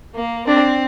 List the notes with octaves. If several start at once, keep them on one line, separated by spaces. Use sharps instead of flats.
A#3
C4 D4